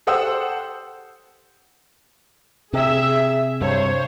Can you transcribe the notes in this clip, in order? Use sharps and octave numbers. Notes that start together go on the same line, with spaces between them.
G4 A4 C5 F#5 D#6 E6
C3 G#4 E5
G2 C3 C5 C#5